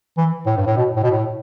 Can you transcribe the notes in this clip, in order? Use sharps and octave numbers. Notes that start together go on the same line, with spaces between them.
E3
A2
G2
A2
B2
A2
B2
A2